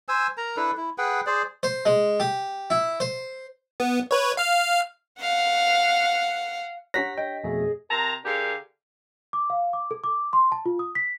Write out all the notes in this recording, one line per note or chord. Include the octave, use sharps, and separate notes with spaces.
C5 G#5 E6
A#4 A#5
D4 E4 A4 B4
E4
G#4 B4 F#5 G5
G#4 C5 D5
C5
G#3
G4
E4
C5
B3
B4 C#5
F5 F6
F5 F#5
D4 G4 C#5 F#5 A#5 F#6 A#6 B6
D#5 G5
F2 B2 A3 G#4
C3 A#4 A5 A#5
D3 D4 G4 G#4 A#4 F5
D6
F5
D6
A4
D6
C6
A5
F4
D#6
B6